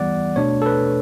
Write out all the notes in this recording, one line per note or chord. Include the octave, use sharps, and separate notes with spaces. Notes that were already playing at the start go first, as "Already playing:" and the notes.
Already playing: E3 G3 B3 D5 F#5
B2 A3 D4 C#5
A4
B4